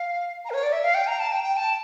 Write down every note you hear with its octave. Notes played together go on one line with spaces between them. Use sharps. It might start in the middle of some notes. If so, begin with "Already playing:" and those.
Already playing: F5
A#5
A#4
C#5
D5
E5
F5
G5
A#5
A5
G5
G5
A5